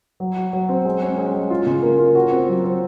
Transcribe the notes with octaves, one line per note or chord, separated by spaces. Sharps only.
F#3
F#4
F#3
C4
G#3
C#4
G#3
G#3
F4
C#3
A#3
F4
F#4
C4
F#3
C4